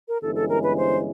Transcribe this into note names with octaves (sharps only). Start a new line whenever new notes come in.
A#4
G1 G2 E3 G#3 C#4 A4
A4
A#4
B4
C5